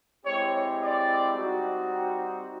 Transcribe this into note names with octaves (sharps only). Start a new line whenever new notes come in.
G#3 C4 E4 G4 C#5
D5
G3 C4 D#4 F#4